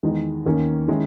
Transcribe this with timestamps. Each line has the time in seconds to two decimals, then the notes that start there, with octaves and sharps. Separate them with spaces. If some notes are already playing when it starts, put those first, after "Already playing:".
0.03 E2 D#3 G#3 D#4
0.46 D#2 D#3 A#3 C#4
0.88 D#3 G#3 C#4 E4